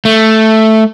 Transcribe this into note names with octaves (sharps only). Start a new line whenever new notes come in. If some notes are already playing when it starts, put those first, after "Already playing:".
A3